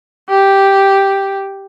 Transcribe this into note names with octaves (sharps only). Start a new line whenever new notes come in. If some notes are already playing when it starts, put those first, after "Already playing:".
G4